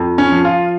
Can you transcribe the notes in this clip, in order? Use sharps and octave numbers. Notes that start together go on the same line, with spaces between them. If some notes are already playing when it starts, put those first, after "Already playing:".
Already playing: F2
C#4
F3
F4